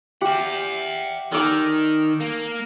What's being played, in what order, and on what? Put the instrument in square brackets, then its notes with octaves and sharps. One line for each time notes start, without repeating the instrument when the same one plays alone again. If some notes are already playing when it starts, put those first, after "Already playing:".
[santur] G4 [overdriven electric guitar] E5 F#5
[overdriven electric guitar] D#3 [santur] G#5 D6 E6
[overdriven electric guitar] A#3